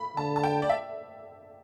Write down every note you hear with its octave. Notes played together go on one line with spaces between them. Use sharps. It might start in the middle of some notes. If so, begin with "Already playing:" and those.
Already playing: B5
D3 A5
A5
G5
D5
E5